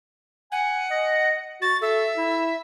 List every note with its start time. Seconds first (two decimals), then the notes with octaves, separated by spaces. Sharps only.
0.52 F#5 G#5
0.91 D#5
1.62 F#4 A6
1.82 A4 E5
2.16 E4